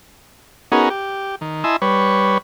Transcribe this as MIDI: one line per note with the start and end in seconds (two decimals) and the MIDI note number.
0.72 0.89 59
0.72 0.89 61
0.72 0.89 63
0.72 0.89 66
0.72 0.89 68
0.72 0.89 70
0.90 1.36 67
1.41 1.64 51
1.64 1.76 64
1.64 1.76 75
1.64 1.76 80
1.64 1.76 81
1.64 1.76 84
1.64 1.76 88
1.82 2.38 55
1.82 2.38 71
1.82 2.38 73